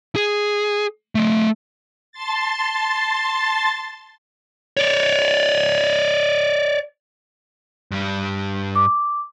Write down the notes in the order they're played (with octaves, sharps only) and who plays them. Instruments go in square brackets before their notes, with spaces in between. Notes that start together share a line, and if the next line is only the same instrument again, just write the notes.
[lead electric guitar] G#4
A3 D#5
[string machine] A5 C6 A6
[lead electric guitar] C#5 D5
G2 G3
[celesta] D6